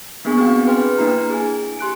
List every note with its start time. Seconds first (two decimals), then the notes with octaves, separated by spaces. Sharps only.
0.25 A#3 B3 D4 G#4 G#5 C#6
0.37 B3 C4 D4 F#4 F5 G5
0.66 G#4 B4 G5 C6 F6
0.97 A#3 D4 E4 A#5 F6
1.30 G#4 G#5
1.79 G4 C6 F#6 D7